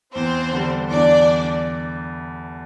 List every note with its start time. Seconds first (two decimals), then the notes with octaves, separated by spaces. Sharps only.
0.14 E2 C4 C5
0.52 D3 G3
0.91 E2 D4 D5